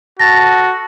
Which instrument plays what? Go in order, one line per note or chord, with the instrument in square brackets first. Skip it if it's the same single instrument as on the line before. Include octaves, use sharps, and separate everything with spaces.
[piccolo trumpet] F#4 [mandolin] A4 A5 [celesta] A6 A#6